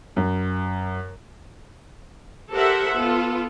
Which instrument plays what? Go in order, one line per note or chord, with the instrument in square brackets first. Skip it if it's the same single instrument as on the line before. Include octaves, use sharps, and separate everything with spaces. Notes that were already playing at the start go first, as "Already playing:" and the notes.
[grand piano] F#2
[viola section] G4 A4 A#4 C5 E5 F#5
B3 F4 A4